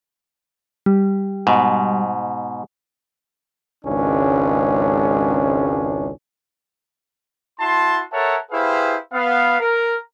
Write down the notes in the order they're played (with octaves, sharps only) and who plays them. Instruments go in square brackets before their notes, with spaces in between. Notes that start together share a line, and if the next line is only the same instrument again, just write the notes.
[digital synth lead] G3
[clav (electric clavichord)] G#2 B2
[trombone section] G#1 C#2 C#4 D4
[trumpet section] E4 F#4 A5 C6
A4 A#4 C#5 E5 F#5 A5
E4 G4 G#4 B4 C5 F5
B3 F5
A#4